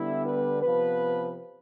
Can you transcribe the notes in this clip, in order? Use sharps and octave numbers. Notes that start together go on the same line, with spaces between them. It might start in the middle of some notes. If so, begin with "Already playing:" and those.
Already playing: D3 G3 B3 E4
B4
C3 F3 B3 B4